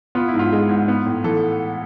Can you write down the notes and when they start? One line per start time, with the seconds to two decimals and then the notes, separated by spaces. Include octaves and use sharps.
0.15 B3 F4
0.28 E4
0.34 G#2
0.39 F4
0.52 G#3
0.69 G#2
0.88 B3
1.06 A2
1.24 E3 A4